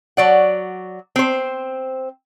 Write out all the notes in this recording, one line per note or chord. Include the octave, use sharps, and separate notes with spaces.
F#3 D5 F#5
C4 C5